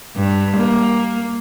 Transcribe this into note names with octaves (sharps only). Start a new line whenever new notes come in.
G2
A#3